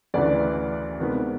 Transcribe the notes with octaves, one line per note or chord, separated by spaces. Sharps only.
D2 C#3 E3 A3 D4 D5
C3 D#3 G#3 B3